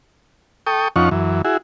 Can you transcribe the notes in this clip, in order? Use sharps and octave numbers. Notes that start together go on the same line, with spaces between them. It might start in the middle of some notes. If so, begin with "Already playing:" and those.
A4 G5 C#6 D#6
F2 F3 C#4 D#4 F#5 C#6
F#2 E3
E4 F#4 G#4